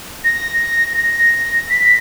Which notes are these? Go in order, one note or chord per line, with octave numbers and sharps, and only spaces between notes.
A#6
A#6
B6